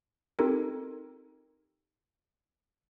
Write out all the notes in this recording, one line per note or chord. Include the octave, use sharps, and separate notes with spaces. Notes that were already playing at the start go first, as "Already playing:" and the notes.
C4 D#4 F4 G4 A4 A#4